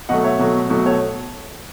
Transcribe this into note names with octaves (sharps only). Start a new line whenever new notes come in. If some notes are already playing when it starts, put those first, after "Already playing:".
B2 F#3 A3 D#5 F#5
C#5 E5
B2 F#3 A3
B2 F#3 A3
A4 C#5